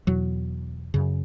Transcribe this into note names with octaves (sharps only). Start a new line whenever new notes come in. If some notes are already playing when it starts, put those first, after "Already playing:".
E2 B2 F#3
F#2 C#3